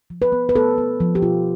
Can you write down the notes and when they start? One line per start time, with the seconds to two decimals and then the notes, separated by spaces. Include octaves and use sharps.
0.10 F3
0.22 B4
0.32 B3
0.49 B4
0.56 B3 A4
0.78 B3
1.00 F3
1.15 G4
1.22 B2 F4